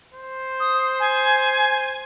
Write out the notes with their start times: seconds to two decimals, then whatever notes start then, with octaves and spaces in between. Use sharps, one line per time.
0.14 C5
0.60 D#6
1.00 G#5